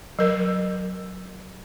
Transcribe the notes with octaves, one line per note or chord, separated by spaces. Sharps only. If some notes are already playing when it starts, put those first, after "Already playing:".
F#3 A#4